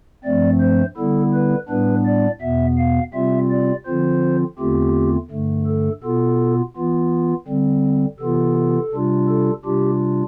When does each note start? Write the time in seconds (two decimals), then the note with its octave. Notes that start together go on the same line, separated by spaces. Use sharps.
0.24 G2 F3 A3 C4 D5
0.61 C5
0.97 D3 G3 B3 E4 A4
1.34 B4
1.69 A2 G3 B3 D4 B4
2.06 D5
2.41 E2 B2 B3 E5
2.78 F5
3.13 C3 G3 C4 F4 E5
3.50 D5
3.86 D3 F3 C4 F4 C5
4.59 E2 D3 A3 C4 F4 G4
5.30 G2 D3 A3
5.67 A4
6.03 B2 B3 F4 A4
6.76 E3 B3 F4
7.48 D3 G3 C4
8.20 C3 E3 B3 F4 A4
8.92 C3 G3 D4 F4
9.28 A4
9.65 C3 G3 D4 F4 G4